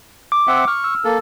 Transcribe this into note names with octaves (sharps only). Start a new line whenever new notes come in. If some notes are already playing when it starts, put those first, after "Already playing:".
D6
C4 E5 F#5
C#6 F6
E6
A#3 A4